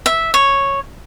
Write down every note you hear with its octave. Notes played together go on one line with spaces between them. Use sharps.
E5
C#5